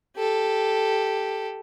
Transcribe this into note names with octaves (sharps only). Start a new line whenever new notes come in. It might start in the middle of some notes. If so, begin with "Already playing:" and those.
G4 A4